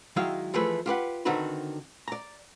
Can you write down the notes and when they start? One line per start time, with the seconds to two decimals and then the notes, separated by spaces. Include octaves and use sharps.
0.16 D#3 F#3 G#3 E4 F5 G5
0.54 E3 F3 A3 G#4 B4
0.86 F4 G4 B4 F#5
1.25 D3 D#3 C4 D#4 F#4 B4
2.08 D5 A#5